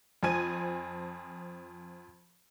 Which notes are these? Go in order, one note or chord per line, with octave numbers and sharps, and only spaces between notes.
F2 F3 C5 G#5 G#6 D#7